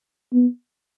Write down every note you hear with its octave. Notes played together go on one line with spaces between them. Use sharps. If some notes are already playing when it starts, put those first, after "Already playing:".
B3